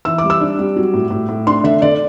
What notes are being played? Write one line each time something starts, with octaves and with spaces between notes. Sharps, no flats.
E3 E6
D6
G3
E6
D4
G3
F#3
A2
A2
A2
D4 C6
D3 E5
D3 D5